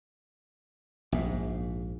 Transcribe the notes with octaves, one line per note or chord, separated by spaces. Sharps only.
A#1 G#2